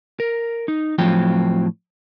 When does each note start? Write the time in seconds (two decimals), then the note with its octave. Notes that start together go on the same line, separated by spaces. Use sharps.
0.20 A#4
0.68 D#4
0.98 A2 F3 F#3 C4 F4 G5